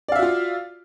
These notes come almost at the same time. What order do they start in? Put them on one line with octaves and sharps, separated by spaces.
D5 F5 E5 F#4 F4